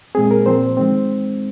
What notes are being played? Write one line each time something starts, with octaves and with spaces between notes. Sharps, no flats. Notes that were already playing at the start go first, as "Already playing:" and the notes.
A#2 G#3 C4 G#4
A#4
A#2 F3 C4 C5
D#3 G#3 C4